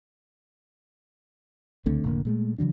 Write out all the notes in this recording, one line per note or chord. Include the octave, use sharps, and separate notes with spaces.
C#2 D3 A3 C4
F1 A2 D3 A#3
A#2 G#3 A3
C#3 E3 F#3 D4